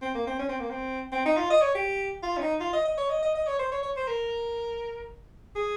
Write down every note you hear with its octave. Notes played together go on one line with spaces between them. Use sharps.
C4
A#3
C4
C#4
C4
A#3
C4
C4
D#4
F4
D#5
C#5
G4
F4
C#4
D#4
F4
D#5
D#5
C#5
D#5
D#5
D#5
C#5
C5
C#5
C#5
C5
A#4
G#4